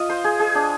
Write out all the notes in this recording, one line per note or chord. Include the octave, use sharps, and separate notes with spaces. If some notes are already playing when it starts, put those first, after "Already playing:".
Already playing: F4 D#5
C5
G#4
G#4
D4